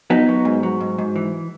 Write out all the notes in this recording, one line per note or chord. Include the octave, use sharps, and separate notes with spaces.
F#3 B3 D#4
F#3
G#2
F#3
G#2
G#2
E3